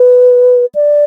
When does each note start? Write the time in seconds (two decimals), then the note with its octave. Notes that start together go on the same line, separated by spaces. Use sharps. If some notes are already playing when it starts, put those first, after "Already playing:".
Already playing: B4
0.75 D5